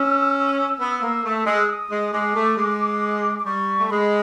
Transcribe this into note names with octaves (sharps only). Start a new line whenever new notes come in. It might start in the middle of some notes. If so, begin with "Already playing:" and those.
Already playing: C#4 E6
B3
A#3
A3
G#3
D#6
G#3
G#3 D6
A3
G#3
D6
G3 C#6
A3
G#3 B5